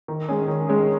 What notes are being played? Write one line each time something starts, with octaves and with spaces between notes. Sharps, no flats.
D#3
G#3 C#4 G#4
D#3
G#3 C#4 G#4